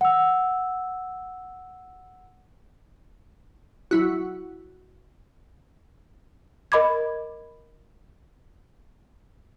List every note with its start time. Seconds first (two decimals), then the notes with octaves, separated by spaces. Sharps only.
0.01 F#5 E6
3.91 F#3 E4 F#4
6.72 A#4 D#5 B5 D6 G#6